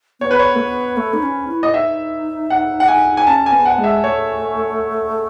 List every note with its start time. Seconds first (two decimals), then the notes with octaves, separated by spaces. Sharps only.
0.20 B3 C#5
0.31 B4
0.39 C#5
0.55 A3
0.59 B3
0.97 A3
1.13 D#4
1.23 C#4
1.48 E4
1.63 D#5
1.73 D#4 E5
2.50 F#5
2.80 F#5
2.88 G#5
3.17 G#5
3.27 C#4 A5
3.46 G#5
3.52 B3
3.65 F#5
3.78 G#3
3.84 E5
4.03 A3 C#5